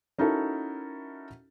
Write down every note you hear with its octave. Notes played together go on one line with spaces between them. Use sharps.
C#4 D#4 E4 F#4 A4 A#4